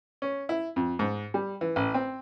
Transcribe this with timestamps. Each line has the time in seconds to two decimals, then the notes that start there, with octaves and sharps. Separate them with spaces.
0.22 C#4
0.49 E4
0.76 F2
0.99 G#2
1.34 G3
1.61 E3
1.76 A1
1.94 C4